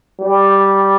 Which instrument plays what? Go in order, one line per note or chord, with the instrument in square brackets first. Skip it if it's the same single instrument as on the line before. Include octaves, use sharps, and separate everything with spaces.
[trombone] G3